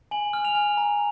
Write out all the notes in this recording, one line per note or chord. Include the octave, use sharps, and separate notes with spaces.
G#5 F#7
F6
F7
G#5
A#5